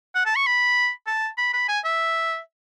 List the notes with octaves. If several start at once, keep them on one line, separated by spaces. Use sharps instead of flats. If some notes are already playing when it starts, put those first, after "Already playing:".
F#5
A5
C#6
B5
A5
B5
B5
G#5
E5